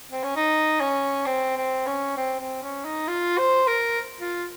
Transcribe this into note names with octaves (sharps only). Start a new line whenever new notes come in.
C4
C#4
D#4
C#4
C4
C4
C#4
C4
C4
C#4
D#4
F4
C5
A#4
F4